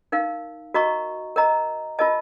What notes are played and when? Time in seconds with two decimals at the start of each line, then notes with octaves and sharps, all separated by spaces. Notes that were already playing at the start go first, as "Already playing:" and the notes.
0.12 D#4 A#4 F5
0.74 F#4 A#4 D#5 A#5 C#6
1.36 A#4 D#5 A#5
1.99 F4 A#4 D#5 A5